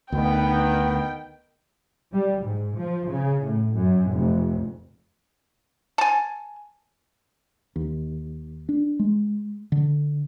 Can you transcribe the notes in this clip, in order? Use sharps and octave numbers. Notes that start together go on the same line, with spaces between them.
D2 D#3 B3 G5
G3
G#2
F3
C#3
A2
F#2
F1
G#5 A5
D#2
D4
G#3
D3